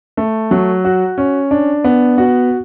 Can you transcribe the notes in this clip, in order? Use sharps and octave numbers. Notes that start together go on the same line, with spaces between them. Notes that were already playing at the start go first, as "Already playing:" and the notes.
A3
F#3
F#4
C#4
D4
B3
F#4